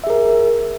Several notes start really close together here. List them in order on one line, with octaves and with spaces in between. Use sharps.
E5 G#4 A#4